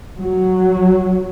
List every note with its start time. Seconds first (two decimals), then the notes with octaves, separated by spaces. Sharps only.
0.18 F#3